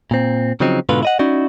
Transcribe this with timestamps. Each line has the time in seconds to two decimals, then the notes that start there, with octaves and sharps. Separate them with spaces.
0.11 A#2 C4
0.60 C#3 F3 F#3 C4 D#4
0.89 G#2 B2 D3 F4 B4
1.03 E4 D#5 F#5
1.19 C#4 D#4 E4 F#4 D5